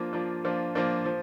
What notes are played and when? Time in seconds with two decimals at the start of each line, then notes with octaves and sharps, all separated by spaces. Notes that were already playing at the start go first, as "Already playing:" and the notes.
Already playing: F3 A#3 D4 F4
0.13 F3 A#3 D4 F4
0.44 F3 A#3 D4 F4
0.75 F3 A#3 D4 F4
1.05 F3